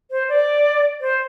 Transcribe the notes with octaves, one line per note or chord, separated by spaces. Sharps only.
C5
D5
C5